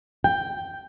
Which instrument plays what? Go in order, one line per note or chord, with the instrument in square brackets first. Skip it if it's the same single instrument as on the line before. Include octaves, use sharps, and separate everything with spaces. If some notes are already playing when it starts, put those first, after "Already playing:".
[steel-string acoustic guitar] G5